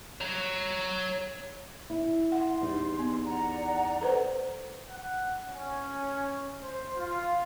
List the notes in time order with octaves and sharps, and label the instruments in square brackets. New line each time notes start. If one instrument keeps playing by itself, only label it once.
[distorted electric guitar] C#5 A#5
[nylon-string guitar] E4
[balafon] F#5 [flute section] C6
[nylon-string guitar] E2 G3 D#4
[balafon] B3
[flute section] D5 F#5 A#5
[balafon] A4 B4 C5
[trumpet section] F#5
C#4
C5
F4